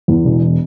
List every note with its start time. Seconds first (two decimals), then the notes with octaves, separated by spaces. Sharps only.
0.08 E2
0.25 E1